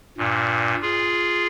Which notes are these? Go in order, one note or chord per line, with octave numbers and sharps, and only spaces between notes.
G2 A#2
F4 G#4